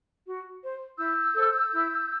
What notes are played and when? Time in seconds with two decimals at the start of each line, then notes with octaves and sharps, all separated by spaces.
0.26 F#4
0.61 C5
0.98 E4 E6 G6
1.35 A4 C5
1.72 E4